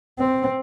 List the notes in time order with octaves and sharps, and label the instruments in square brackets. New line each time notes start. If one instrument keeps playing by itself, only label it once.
[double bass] C4